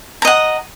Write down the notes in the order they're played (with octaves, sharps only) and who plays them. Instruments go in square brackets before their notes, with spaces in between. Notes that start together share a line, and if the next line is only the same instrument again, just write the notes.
[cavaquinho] A#5
D#5
F#5